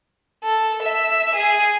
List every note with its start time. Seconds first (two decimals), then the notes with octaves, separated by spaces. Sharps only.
0.44 A4
0.83 E5
1.35 G#4